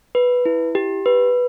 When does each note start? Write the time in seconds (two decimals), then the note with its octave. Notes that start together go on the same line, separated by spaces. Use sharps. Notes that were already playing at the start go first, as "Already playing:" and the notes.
0.15 B4
0.45 E4
0.75 G4
1.06 B4